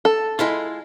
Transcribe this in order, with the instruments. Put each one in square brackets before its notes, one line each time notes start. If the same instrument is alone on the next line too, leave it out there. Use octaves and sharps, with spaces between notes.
[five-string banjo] A4
[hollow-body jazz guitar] G#3 E4 F4